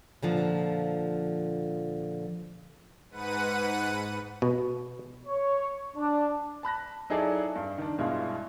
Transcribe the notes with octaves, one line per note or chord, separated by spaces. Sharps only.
A#2 D3 F3
G#2 B4 F#5 D#7
B2
C#5
D4
A5 B5 F#6 A#6
F#3 D#4 E4 G#4 A4 D5
G2
D#3 D4
G2 B2 G#3 E4 F4